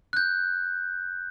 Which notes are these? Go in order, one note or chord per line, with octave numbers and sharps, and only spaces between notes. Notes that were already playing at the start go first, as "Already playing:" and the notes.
F#6 G6